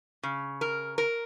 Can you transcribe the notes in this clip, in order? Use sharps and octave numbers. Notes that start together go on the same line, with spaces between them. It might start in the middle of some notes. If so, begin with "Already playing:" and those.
C#3
A#4
A#4